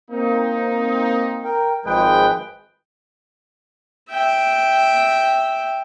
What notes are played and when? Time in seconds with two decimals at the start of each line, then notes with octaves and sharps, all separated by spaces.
0.11 A#3 C4 D#4
1.44 A#4 G5
1.86 G#1 F3 G#3 G#4 B4 G5
4.10 E5 G5